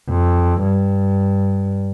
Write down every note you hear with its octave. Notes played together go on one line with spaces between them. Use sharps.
F2
G2